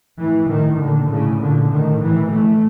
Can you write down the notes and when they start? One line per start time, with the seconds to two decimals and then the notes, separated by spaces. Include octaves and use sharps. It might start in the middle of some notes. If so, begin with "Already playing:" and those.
0.19 A2 E3
0.49 A2 D#3
0.79 A#2 D3
1.10 A2 C#3
1.41 A#2 D3
1.71 A2 D#3
2.01 A2 E3
2.31 A2 A3